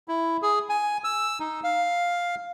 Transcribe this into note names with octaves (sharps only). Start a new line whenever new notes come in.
E4
G#4
G#5
E6
D#4
F5